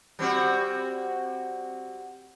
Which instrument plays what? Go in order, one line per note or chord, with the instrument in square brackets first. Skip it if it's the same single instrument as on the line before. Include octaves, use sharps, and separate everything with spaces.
[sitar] G3 C4 F#4